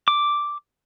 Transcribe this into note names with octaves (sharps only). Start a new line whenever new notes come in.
D6